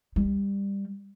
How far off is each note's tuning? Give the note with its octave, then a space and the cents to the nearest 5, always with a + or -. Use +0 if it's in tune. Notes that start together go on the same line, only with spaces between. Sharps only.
G3 +20